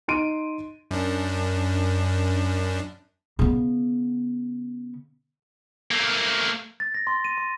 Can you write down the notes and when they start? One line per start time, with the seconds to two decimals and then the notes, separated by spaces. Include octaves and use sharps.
0.08 D#4 C6 D7 D#7
0.91 F#2 D4
3.39 C#3 B3
5.91 A3 A#3
6.80 A6
6.94 A#6
7.07 C6
7.25 D#7
7.38 C6